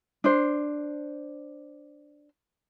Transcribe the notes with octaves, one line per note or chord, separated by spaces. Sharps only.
D4 C5